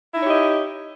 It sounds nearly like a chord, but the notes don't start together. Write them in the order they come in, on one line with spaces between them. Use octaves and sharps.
E4 D#4 C#5 G4 D#5